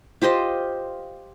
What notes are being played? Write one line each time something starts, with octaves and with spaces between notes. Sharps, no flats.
F4 G4 C5 D#5